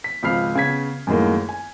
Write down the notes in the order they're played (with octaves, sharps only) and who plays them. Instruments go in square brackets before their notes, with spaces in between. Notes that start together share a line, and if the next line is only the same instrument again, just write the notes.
[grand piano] B6
G#1 C#2 F3 B5 F6 C7
C#3 B3 G#6 B6
F#2 A2 D#3 G#3 A#3
G#5